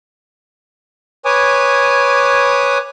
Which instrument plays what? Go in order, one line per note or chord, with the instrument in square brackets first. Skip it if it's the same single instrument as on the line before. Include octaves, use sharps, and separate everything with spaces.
[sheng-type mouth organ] B4 C#5 G#5 D6 D#6